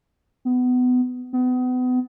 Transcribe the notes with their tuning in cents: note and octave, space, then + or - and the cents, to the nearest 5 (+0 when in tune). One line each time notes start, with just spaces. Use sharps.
B3 +20
B3 +35